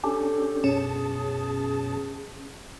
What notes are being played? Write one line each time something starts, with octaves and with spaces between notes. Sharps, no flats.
C#4 D4 G4 A4
F#2 B2 C#4 G#4 A5